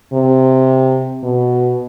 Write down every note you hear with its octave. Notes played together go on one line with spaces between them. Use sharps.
C3
B2